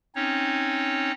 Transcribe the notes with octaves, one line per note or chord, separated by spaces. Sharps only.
C4 C#4 D#4 C#5